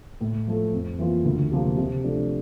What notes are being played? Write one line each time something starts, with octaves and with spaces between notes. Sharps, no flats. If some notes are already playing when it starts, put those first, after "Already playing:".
A2
F3 A3
F2
E3 A#3 F4
D2
C3 F3 A#3
C3
F3 A3 D4